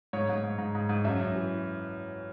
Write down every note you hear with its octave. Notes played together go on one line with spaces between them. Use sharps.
G#2 C#5
G#2
G#2
G#2
G#2
G#2
F#2 E5
F#2
E3